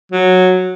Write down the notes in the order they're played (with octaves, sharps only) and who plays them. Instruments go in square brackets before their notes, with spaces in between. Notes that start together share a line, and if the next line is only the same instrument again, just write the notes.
[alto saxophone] F#3